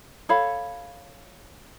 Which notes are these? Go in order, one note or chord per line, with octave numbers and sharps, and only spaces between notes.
A4 C#5 F5 B5